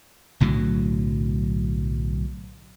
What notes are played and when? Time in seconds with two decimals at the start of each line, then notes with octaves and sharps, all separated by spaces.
0.40 B1 A2 D3 F#3